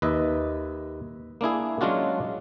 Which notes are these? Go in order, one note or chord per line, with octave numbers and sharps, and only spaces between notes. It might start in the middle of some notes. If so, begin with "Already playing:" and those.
D#2 B4 D#5 E5
A#3 D4 E4 G#4
F#3 G#3 C#4 D4 F4 F#4